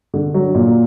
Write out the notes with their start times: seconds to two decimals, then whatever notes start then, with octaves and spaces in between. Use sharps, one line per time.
0.14 D3
0.34 F#3
0.55 A#2